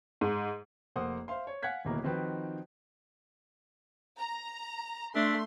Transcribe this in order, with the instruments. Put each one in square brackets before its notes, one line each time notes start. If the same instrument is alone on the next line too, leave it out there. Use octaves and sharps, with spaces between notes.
[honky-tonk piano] G#2
[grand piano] F1 A#3 C5 F#5 D#6
C5 E5 F5 C6
C#5
F5 F#5 G#5 F#6 G#6 B6
D1 D#2 B2 A#3 E4 A#5
D#3 F3 C4 D#4 F#4 B4
[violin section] A#5
[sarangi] A3 [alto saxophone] D4 [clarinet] E5 [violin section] C6